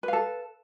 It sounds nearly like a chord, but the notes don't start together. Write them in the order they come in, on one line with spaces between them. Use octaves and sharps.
B4 F5 A4